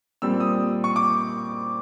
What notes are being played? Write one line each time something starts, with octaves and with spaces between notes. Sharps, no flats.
A#2 G3 C4 E6
D#6
C#6
D6